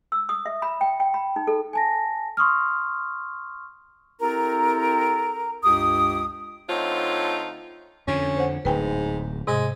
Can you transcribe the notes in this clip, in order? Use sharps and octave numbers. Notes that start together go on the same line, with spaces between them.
E6
D#6
E5
B5
G5
G5
B5
D#4
A4
G#5 A5 A#6
C6 C#6 D#6 F6
C4 E4 G4 A4 A#4 A#5
C#2 G2 G4 D6 D#6
D3 A3 C4 D#4 F4 C#5
F2 D3 C#4
C5 F#5
D1 G#2 B4 G5 G#5
G#2 C3 G#3